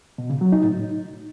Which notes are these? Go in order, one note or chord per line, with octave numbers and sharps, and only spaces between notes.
B2
C#3
F#3
D#4
A2